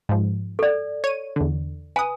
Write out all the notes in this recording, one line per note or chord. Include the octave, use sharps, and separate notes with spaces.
G#2 F3
A4 D5
C#5 D#7
E2 D3
B4 G#5 D#6